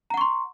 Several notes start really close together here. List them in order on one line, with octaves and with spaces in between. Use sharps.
A#5 F#5 C#6 C6